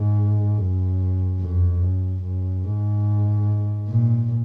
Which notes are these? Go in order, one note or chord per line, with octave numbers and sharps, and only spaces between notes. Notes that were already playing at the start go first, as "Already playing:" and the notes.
Already playing: G#2
F#2
F2
F#2
F#2
G#2
A#2